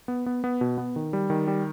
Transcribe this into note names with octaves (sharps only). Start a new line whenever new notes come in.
B3
B3
B3
B2
B3
D#3
G3
D#3
G3